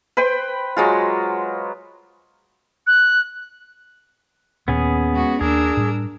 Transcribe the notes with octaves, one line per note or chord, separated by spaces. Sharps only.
B4 C5 G5
F#3 G#3 F4
F#6
D#2 A#2 B3 C#4 G#4
G#3 F#4
D#2 A#3 D4 G#4 A#4 E6
A2 G3